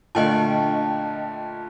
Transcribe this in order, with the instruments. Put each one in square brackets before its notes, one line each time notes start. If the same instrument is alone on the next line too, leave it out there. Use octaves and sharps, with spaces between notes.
[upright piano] A#2 D3 A3 [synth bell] D#5 G5 A5